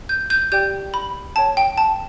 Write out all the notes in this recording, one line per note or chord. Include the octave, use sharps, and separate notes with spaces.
G6
G6
G4 D5 G5 G6
B5
C#5 G5 A5
G5
A5